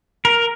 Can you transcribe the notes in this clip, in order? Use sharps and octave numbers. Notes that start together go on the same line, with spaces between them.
A#4